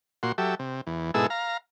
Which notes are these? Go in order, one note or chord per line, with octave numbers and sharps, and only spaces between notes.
A#2 F#4 C6
F#3 G4 A4 E5
C3
E2
G#2 B2 E4 G#4 A4 E6
F5 A#5